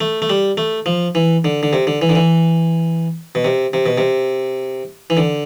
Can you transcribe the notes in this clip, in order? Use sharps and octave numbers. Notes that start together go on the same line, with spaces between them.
A3
A3
G3
A3
F3
E3
D3
D3
C3
D3
E3
D3
E3
B2
C3
C3
B2
C3
E3
D3